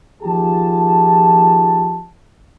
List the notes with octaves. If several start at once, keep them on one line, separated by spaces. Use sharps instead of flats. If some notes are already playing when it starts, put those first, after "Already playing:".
D#2 F3 F4 G4 G#4 A5